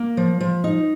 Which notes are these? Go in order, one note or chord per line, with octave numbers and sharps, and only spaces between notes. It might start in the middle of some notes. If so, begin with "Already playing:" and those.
Already playing: A#3
F3
F3
D#4